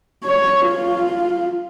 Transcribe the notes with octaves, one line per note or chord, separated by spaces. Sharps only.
C#5
F4